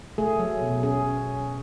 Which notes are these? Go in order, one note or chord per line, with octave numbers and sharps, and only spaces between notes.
A3 G#4
F#3
B2
C#4 G#4